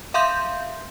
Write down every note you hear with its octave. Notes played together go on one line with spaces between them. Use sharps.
E5 F5 C6 G6